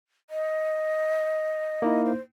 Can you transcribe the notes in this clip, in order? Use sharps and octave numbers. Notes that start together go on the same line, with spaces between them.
D#5
A#3 D#4 E4
C5